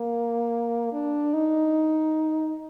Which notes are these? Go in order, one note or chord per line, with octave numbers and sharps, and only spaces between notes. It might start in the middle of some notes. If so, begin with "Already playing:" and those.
Already playing: A#3
D4
D#4